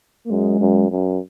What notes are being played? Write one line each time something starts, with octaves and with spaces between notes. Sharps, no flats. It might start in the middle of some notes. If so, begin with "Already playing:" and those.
A#3
F#2 G#3
F#2
F#2